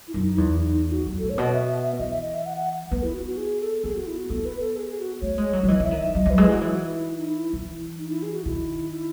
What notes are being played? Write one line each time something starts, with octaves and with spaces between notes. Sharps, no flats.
E4
F#2 D#4
D#4
E2 E4
D#4
D#4
D#4
F#4
F#2
A2 A4
C#5
B2 D#5
E5
E5
E5
E3 D#5
E5
D#5
E5
F#5
F#5
B3 B4
E4
F#4
F#4
G#4
A4
B3 G#4
F#4
E4
F#4
B3 A4
B4
A4
G#4
G#4
F#4
A3 C#5
G#3
F#3
F#3
E3 D#5
E3 E5
D#3
E5
F#3 D#5
F#3 B4
G#3
F#3 E4
E3
F#4
E4
E4
E4
D#4
E4
E3
D#4
E4
G#4
F#4
D#3 E4
E4